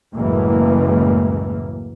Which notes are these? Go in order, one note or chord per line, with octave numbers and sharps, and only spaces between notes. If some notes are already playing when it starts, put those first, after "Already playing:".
F#1 C#2 F#2 A2 E3 A#3